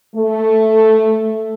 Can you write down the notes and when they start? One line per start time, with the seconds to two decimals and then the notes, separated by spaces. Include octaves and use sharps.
0.15 A3